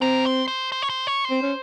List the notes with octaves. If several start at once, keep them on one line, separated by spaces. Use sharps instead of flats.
C4 A#4
C5
C5
C5
C#5
C5
C#5
C5
C4
C#4